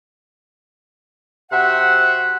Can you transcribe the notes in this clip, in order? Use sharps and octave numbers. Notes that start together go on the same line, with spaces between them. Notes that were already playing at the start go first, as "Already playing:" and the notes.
C3 F#4 C5 E5 F#5